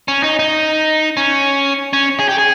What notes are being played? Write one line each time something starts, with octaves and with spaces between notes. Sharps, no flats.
C#4
D#4
D#4
C#4
C#4
G#4
G4
G#4